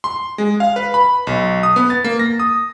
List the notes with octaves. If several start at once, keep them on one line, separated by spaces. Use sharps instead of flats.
C6
G#3
F5
B4
B5
B1
D#6
B3
A6
A#3
A#6
D#6